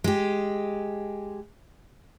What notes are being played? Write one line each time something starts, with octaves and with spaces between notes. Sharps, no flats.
G#3 G4